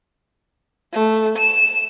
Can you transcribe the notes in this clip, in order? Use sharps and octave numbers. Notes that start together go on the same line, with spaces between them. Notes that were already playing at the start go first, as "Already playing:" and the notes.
A3
E7